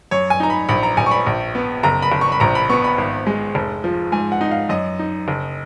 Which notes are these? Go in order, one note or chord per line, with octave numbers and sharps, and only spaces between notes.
F#2 C#5
G#5
D#4 A#5
B5
A#1 B5
A#5
A#1 G#5
C#6
B5
A#1
B3
F#1 A#5
B5
F#1
C#6
B5
A#1 A#5
B5
B3 C#6
B5
G#1
G#3
F1
F3
G#2 G#5
F#5
D#4
F5
F#2 D#5
D#4
F#1